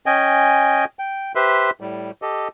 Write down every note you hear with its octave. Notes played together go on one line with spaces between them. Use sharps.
C#4 D#5 G5 G#5
G5
G4 B4 C5 E5 C6
A2 G3
G4 A4 D#5